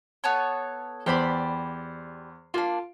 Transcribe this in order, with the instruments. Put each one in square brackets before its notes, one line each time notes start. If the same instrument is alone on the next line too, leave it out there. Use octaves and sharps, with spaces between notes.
[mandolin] B3 A4 C#5
[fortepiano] E2 C5 [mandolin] G4 D5 B5
[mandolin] A#3 D4 [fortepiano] F4